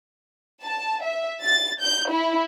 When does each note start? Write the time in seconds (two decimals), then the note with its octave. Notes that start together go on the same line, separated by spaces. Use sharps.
0.62 A5
1.03 E5
1.42 A6
1.81 G6
2.10 E4